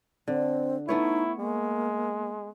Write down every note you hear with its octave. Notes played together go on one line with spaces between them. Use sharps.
D3 C4
A3 B3 D#4 E4 C#5
G#3 A#3